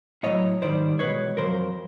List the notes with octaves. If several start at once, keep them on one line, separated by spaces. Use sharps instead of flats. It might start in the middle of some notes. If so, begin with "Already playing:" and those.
A2 F#3 C#5 D#5
G#2 D#3 G3 C5 D5
E2 B2 G#3 B4 C#5
F2 C#3 F#3 A#4 C5